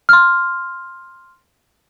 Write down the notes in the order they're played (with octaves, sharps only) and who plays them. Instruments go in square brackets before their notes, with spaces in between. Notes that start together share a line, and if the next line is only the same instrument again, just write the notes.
[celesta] C6 F6